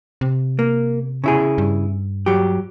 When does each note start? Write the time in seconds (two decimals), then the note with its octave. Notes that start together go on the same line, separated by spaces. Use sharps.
0.21 C3
0.59 A#3
1.24 C#3 E4 G#4
1.58 G2
2.26 F#3 G4